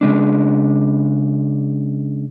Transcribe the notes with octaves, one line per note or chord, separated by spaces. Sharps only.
C#3 G#3 D4